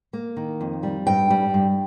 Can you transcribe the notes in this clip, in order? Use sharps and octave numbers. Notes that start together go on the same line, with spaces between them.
A#3
D#3
F2
G3
G2 G5
G3
G2